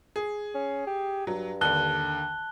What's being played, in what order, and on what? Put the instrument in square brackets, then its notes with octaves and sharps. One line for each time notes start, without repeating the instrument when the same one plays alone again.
[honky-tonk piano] G#4
[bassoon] C#4
G4
[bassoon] G2 [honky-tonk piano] F#3
[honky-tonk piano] D#2 D3 [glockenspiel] A5 F#6 G7